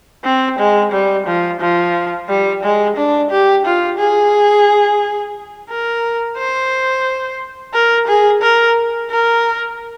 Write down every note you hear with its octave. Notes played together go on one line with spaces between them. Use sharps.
C4
G#3
G3
F3
F3
G3
G#3
D4
G4
F4
G#4
A#4
C5
A#4
G#4
A#4
A#4